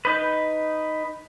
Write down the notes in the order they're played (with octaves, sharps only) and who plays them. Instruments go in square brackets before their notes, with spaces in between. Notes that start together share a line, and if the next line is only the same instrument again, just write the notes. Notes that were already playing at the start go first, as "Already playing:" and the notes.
[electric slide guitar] D#4 B4